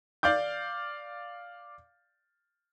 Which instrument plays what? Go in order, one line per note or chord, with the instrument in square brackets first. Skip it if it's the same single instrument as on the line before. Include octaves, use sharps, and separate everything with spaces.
[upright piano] D5 F5 D6 G6